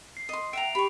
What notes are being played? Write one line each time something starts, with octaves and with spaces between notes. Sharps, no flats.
C7
D#5 C6
E5 F#5 G5 A#5 D7 F7
G4 B5 C#6